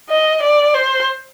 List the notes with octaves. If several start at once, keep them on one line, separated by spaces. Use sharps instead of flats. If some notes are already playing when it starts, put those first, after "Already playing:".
D#5
D5
C5